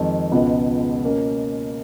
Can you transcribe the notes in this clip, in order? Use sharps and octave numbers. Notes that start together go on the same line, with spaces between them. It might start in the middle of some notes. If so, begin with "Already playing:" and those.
Already playing: F2 D#3 G#3
C#2 B2 G#3 B3 F4
B2 A#3 C#4